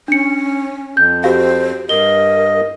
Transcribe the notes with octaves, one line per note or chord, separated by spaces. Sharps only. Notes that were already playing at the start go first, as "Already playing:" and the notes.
C#4 D4 C#7
F2 G6
F#4 G4 C5 F5
G2 A#4 D#5 G7